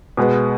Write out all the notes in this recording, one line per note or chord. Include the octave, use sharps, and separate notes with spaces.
B2 G#3 B3